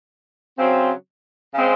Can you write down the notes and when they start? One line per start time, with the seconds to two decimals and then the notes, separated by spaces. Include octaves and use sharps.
0.57 C#3 F#3 C4
1.54 C#3 G#3 C4